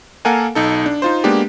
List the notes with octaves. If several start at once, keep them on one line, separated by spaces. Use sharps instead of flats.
A#3 A4 A#4 F5 F#5 G#5
B1 D#4 A4
D4
D#4 F4 C5
G#3 A#3 B3 D4 G4